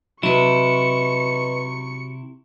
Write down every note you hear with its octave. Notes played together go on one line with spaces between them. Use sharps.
C3 F#3 E4 B4 D#5 C#6 C#7